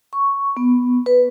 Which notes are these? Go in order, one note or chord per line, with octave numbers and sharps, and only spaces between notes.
C#6
B3
B4